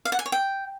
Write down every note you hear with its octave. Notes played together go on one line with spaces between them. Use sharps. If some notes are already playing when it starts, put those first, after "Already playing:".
F5
F#5
G#5
C#5
G5